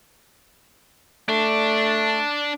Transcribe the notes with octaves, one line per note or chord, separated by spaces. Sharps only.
A3 D4